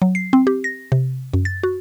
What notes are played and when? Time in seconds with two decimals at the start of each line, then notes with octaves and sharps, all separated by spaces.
0.02 F#3
0.15 C7
0.33 C4
0.47 G4
0.64 A#6
0.92 C3
1.34 F#2
1.45 A6
1.63 F#4